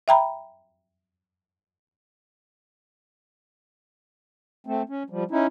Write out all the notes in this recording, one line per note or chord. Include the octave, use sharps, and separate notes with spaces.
E5 G5 A#5 B5
A3 C4
C#4
F3 G3
C#4 D#4 E4